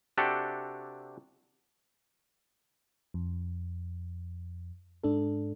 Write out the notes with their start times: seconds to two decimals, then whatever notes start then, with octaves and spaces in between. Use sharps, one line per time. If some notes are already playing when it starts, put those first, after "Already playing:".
0.18 C3 D4 F#4 G4 A4
3.14 F2
5.03 G#2 D4 A4